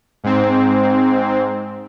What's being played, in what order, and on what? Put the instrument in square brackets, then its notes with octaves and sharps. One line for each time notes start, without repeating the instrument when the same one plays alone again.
[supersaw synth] G#2 C4